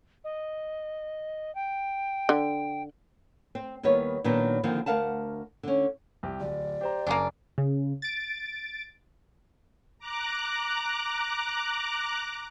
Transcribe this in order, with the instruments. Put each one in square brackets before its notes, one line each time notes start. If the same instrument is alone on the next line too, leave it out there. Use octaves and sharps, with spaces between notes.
[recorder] D#5
G5
[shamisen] D3
[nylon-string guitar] C4
D#2 D#3 G3 B3 C#5
A#2 D#3 F#3 B3 D4 D#4
D3 D#3 F3 A#3 C4
D2 A#4 F5 F#5 A5
D3 C#4
[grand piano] C2 G4
[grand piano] D1 [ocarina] D5
[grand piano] G4 C5 A#5
[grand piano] F#1 [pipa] A#3 C#4 D4
[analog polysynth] C#3
A6 D7
[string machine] A#5 D6 F#6